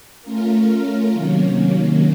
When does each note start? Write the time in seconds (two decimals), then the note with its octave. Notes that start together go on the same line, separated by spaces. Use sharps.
0.22 A3 C#4 F4 A#4
1.12 C3 D#3 F#3 A#3 C#4